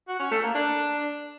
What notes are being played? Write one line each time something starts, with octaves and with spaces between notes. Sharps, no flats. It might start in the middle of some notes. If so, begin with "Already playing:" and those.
F#4
C#4
A3
A#3
D4